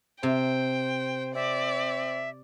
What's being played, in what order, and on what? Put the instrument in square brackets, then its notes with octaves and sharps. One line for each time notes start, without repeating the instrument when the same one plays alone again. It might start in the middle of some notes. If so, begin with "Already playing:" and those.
[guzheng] C3 [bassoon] C5 [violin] G5
[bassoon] C4 [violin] D5 [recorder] E5